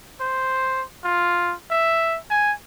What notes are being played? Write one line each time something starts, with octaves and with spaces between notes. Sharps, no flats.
C5
F4
E5
G#5